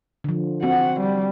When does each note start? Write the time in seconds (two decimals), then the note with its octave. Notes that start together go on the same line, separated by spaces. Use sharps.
0.24 D3 F3
0.63 C4 F#4 F#5
1.01 G3